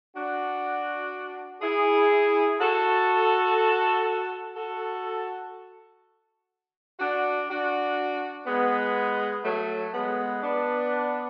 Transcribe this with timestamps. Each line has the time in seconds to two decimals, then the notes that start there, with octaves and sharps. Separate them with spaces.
0.15 D4 F#4
1.62 E4 G#4
2.60 F#4 A4
4.56 F#4 A4
7.00 D4 F#4
7.50 D4 F#4
8.47 G#3 B3
9.45 F#3 A3
9.94 G#3 B3
10.43 B3 D4